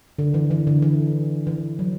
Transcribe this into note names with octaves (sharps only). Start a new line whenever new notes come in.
D3
E3
E3
D3
E3
E3
F#3